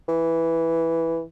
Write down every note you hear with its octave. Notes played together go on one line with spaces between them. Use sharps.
E3